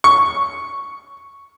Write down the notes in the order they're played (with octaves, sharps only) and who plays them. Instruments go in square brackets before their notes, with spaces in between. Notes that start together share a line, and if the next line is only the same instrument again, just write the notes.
[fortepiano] C#6